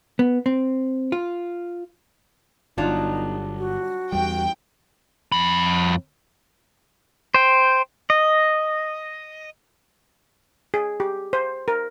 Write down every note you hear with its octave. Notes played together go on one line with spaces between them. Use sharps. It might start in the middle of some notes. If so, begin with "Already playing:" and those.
B3
C4
F4
G1 F#3 D4 D#4 F4
F#4
E2 G3 G5
F2 B5
C5 G5
D#5
G#4
G4
C5
A#4